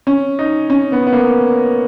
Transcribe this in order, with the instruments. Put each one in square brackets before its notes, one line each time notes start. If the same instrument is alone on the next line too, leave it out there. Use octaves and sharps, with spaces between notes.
[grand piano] C#4
D#4
C#4
B3
B3
A#3